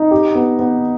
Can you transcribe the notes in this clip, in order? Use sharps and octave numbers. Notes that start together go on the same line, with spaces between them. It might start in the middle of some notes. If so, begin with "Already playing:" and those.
Already playing: D#4
G4
B3
B3